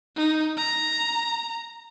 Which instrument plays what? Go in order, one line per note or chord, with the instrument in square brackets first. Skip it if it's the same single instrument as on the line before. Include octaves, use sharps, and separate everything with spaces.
[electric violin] D#4
A#5